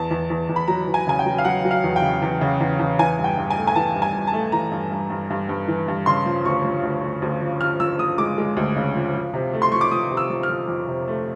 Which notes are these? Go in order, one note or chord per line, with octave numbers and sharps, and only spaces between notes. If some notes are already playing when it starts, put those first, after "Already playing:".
Already playing: E2 A5
E2
E2
E2
B5
F#3 A#5
E2
G#5
C#3 G#5
G5
F#3
F5
F#3 F#5
F#3
F5
E2
G5
C#3
E2
C#3
E2
E2
E3 G#5
G2
G5
G2
G#5
A3
G#5
E3 A5
G2
G#5
G2
A5
A3
E3 A#5
G2
G2
G2
G2
G2
E3
G2
C#3 C6
F3
D2 C#6
F3
D2
D2
D2
F3
F3 F6
F3 E6
F3 D#6
G#3 D6
G#3
D2
C#3
F3
F3
C3
A3
C6
F3 C#6
D6
F3 D#6
C3
E6
F3
F6
F3
F2
C3
A3